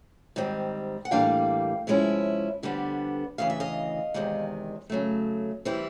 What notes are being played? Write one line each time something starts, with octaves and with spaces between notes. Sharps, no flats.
G#2 D#3 G3 C4
F#5
A2 E3 G3 A#3 D4 F5 G5
C3 F3 G#3 C#4 E4
F2 D3 G3 B3 D4
D2 C#3 E3 F5
E5
D#5 F5
E2 C3 D#3 G#3
C#3 F#3 A3
E3 G3 C4 E4